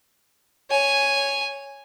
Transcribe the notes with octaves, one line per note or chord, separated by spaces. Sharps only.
C#5 G#5